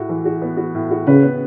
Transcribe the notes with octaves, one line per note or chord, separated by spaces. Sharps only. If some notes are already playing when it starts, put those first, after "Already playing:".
Already playing: A2 F#4
E3
F#4
B3
F#4
A2
F#4
C#3 B4
B3